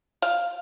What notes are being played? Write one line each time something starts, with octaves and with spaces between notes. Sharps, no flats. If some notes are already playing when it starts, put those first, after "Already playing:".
F5